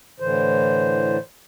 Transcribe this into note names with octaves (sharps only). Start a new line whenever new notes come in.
A2 D3 E3 C5